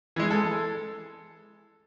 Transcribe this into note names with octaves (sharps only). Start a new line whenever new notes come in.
E3 G#3
A4